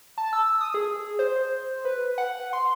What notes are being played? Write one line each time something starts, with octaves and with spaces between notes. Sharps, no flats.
A5
E6
D#6
G#4
C5
B4
F#5
C6